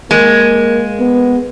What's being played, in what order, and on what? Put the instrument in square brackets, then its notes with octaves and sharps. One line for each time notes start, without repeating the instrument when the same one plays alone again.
[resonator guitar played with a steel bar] G#3 [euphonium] A#3
[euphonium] B3